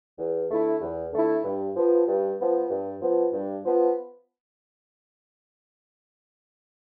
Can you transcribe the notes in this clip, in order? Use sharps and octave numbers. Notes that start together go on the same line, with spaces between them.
E2
D3 A3 E4
E2
D3 A3 E4
G2
F3 B3
G2
F3 B3
G2
F3 B3
G2
F3 B3